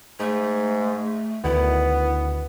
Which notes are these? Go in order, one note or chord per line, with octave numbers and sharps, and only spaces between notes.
G#2 A3
D2 D#3 B3 E4